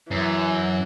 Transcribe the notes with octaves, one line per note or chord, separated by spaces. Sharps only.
F#2 E3